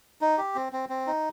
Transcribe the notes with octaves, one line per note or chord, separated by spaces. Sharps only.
D#4
G4
C4
C4
C4
D#4